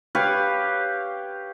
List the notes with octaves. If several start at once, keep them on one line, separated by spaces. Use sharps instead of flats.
G4 B4 C#5 F5